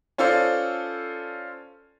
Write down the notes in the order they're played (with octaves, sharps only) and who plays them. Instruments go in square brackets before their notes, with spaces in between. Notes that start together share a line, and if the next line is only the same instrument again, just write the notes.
[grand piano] C#4 F4 A4 C5 D5